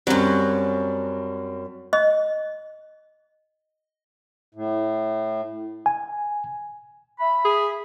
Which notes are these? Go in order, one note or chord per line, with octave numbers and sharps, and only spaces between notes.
F#2 F#3 G3 C4
D#5
A2
G#5
E5 B5
G#4